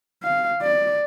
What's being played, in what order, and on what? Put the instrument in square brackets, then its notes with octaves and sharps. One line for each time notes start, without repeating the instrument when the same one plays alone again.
[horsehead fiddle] F5
D5